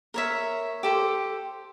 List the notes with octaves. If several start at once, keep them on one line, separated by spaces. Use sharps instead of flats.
A#4 C#5 E5
G4 A4 C5